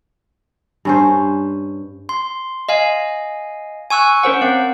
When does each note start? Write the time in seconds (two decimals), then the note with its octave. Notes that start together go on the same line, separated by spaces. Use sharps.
0.85 G2 C#4 C5
2.09 C6
2.69 D#5 F5 G#5
3.90 G#5 C#6 E6 F#6
4.23 C#4 A#4 C5 F#5
4.41 C4 F5